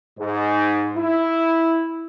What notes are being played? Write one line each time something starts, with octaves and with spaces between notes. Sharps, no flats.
G#2
E4